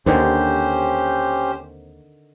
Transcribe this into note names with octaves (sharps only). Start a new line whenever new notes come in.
D#2 D3 D#3 C4 C#4 G4 C5